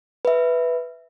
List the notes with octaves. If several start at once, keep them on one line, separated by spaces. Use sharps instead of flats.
B4 E5